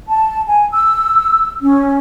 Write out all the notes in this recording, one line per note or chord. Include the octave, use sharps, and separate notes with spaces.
A5
G#5
E6
C#4